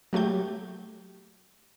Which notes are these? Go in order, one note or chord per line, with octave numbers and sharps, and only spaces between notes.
F#3 A3 G4 G6